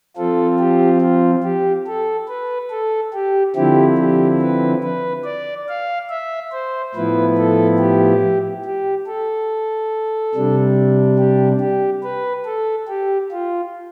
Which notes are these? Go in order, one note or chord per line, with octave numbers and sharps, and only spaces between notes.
F3 C4 F4 A4
G4
F4
G4
A4
B4
A4
G4
D3 F3 C4 E4 G4
G4
B4
B4
D5
F5
E5
C5
A2 F3 B3 E4 B4
A4
G4
G4
A4
C3 G3 D4
G4
G4
B4
A4
G4
F4